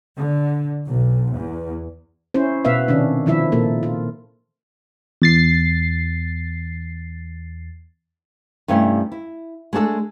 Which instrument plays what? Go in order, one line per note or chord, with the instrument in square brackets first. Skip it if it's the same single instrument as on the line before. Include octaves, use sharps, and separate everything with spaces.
[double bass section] D3
B1
E2
[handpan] C#4 E4 C5
B2 B3 B4 E5 F5
C3 D#3 C#4 D4
D#3 F3 E4 E5
A#2 A#3 A4
F4
[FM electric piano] E2 A6 C7
[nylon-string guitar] G2 C3 A3 C#4 E4
E4
G#3 A3 D4 F#4 A4